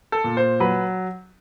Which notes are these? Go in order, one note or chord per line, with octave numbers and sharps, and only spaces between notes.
A4
A#2
C5
F#3 B4